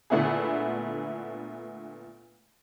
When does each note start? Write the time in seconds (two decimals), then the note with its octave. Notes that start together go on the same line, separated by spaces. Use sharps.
0.10 A#2 D3 A3 B3 E4 G#4